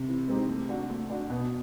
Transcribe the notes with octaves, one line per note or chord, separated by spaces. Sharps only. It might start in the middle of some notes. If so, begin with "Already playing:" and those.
Already playing: C3
E3
G#3 C4 D#4 G4
A3
D4 F#4
A3
D4 F#4
B2 B3